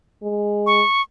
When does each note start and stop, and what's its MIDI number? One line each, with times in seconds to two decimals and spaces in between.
0.22 0.81 56
0.66 1.02 85